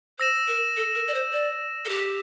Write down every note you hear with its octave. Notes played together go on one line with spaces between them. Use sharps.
C5 E6 A#6 E7
A#4
A4
A#4
D5
C5
D5
A4
G4